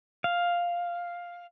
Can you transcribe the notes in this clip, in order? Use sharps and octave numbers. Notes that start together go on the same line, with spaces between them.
F5